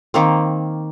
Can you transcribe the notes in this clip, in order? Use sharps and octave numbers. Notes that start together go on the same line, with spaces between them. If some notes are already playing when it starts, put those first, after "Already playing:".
D#3 A#3 C4